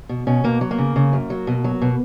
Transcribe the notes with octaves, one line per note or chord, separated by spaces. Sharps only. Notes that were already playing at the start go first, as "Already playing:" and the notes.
B2
B2 C#4
B2 A#3
F#3
A#3
C#3
C#3
F#2
F#3
B2
F#3
B2